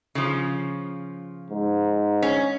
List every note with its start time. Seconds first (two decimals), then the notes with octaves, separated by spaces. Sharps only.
0.15 C#3 F3
1.50 G#2
2.22 C#4